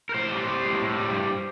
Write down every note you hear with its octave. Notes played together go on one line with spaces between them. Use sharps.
A#4
A2 C5
G3
G3
A2
A2
G3
G2